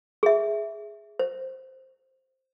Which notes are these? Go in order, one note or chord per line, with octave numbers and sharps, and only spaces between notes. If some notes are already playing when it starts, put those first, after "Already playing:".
G#4 E5
C5